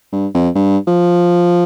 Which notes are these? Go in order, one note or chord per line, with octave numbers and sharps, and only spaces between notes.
G2
F2
G2
F3